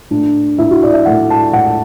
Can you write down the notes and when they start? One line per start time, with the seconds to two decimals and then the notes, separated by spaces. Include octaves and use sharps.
0.11 A2 A3 D4
0.58 A2 A3 E4
0.71 F#4
0.83 D5
0.94 E5
1.05 A2 A3 F#5
1.30 A5
1.53 A2 A3 F#5